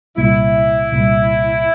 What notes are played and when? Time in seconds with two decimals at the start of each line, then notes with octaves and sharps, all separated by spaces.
0.17 C2 A#2 G3 A#3 E4
0.91 C2 A#2 G3 A#3